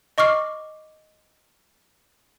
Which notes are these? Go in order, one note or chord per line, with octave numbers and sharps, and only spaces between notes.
D#5 C#6 D6 F6 C7